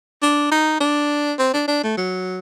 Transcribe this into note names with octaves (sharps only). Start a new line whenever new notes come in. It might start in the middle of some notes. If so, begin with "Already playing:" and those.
D4
D#4
D4
C4
D4
D4
A3
F#3